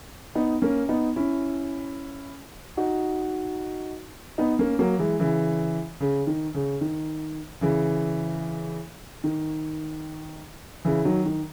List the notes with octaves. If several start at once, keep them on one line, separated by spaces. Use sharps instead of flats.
B3 D#4
A#3 C#4
B3 D#4
C#4 E4
D#4 F#4
B3 D#4
A#3 C#4
F#3 A#3
E3 G#3
C#3 E3
C#3
D#3
C#3
D#3
C#3 E3
D#3
C#3 E3
D#3 F#3
D#3